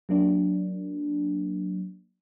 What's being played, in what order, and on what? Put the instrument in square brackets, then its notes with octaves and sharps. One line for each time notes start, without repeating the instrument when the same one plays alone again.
[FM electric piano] F#3 A#3 D4